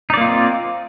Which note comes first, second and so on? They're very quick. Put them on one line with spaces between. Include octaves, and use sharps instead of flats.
D#4 D5 A#3 F4 C4